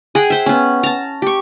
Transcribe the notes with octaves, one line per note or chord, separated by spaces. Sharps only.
G#4 F#5 G5
C5 E5
B3 C#4
A5 A#5
G4 C#6